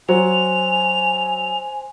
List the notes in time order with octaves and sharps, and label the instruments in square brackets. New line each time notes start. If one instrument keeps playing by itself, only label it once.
[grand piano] F#3 [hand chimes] C5 [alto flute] G#5 [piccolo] F7